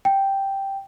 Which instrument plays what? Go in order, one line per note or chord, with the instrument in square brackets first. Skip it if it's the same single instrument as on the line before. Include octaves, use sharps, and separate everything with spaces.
[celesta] G5